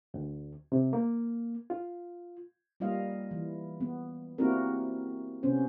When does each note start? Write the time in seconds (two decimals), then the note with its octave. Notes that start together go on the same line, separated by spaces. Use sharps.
0.14 D2
0.72 C3
0.93 A#3
1.70 F4
2.80 G3 A#3 F4 D#5 F5
3.31 E3
3.81 B3
4.38 A#3 C4 E4 F#4 G4 A#4
5.43 C3 B3 C#4 C5